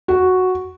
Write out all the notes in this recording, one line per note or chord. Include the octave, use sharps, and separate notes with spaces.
F#4